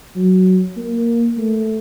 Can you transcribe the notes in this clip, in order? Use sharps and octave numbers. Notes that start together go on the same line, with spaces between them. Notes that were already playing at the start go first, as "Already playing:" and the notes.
F#3
A#3
A3